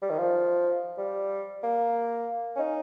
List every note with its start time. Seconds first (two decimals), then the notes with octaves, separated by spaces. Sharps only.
0.02 G3
0.10 D#3
0.18 F3
0.98 G3
1.63 A#3
2.56 C#4
2.59 D#4